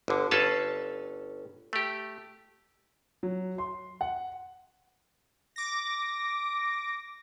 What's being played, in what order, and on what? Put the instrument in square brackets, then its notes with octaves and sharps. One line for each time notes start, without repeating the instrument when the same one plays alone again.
[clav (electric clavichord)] G1 D3
G1 C#4 A4 B4 F5 A5
A3 G4
[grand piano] F#3
C6
F#5
[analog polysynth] D6 A#6